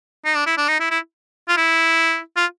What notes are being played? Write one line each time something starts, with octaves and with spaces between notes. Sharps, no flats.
D#4
D4
E4
D4
D#4
E4
E4
F4
E4
F4